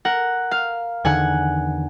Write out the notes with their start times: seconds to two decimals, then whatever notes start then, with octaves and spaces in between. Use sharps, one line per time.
0.05 A#4 F#5
0.51 F5
1.05 E2 D3 D#3 F#5 G#5